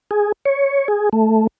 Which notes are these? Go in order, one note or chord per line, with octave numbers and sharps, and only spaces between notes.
G#4
C#5
G#4
A3